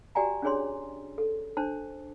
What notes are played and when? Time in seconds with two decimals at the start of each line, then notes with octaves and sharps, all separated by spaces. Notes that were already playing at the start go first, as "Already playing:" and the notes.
0.15 F#4 G4 D5 G5 G#5 A#5
0.42 C#4 D4 G#4 C#5 C6
1.18 A4
1.57 D4 C5 A5